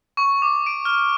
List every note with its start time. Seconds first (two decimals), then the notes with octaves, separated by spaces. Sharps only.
0.17 C#6
0.42 D6
0.66 D7
0.85 F6